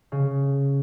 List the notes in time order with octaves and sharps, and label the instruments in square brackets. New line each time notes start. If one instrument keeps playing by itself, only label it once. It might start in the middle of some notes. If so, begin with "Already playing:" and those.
[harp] C#3